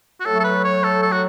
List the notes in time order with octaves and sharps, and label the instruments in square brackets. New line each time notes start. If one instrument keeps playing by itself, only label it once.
[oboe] F#4
[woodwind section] A2 F#3 A3 [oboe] A4
[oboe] A4
B4
C#5
A4
A4
F#4